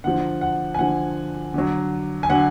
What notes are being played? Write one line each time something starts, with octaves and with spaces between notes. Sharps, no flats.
D3 F3 F#5
F#5
G#5
D3 F3 F#5
D3 F#3
G#5
D3 F#3 F#5